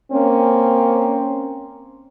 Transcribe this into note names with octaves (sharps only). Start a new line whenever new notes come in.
A#3 C4 C#4